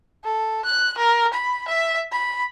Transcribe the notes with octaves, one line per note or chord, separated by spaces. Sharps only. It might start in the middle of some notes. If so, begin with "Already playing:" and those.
A4
F#6
A#4
B5
E5
B5